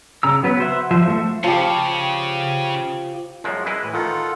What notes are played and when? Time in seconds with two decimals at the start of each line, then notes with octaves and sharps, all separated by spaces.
0.23 C#3 A#5 E6
0.43 F#3 B3 B4
0.60 C5 E5 F#5
0.91 F3 C5 E5
1.08 A3 E5
1.44 C#3 F3 G4
3.44 F#2 F3 G#3
3.66 G#3 E4 B4 D#5
3.82 A2 E3
3.94 D#3 F4 A4 F#5